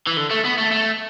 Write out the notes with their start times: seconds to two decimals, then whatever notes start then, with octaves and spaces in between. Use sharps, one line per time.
0.07 E3
0.17 D3
0.30 A3
0.45 B3
0.58 A3
0.71 A3